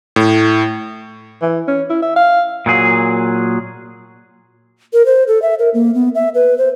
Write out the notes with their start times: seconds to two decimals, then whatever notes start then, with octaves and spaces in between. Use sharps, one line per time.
0.16 A2
1.42 E3
1.68 C#4
1.90 E4
2.02 E5
2.16 F5
2.66 A#2 F#3 G#4
4.93 A#4
5.06 C5
5.28 A4
5.42 E5
5.59 A#4
5.74 A#3
5.94 B3
6.15 E5
6.35 B4
6.58 C5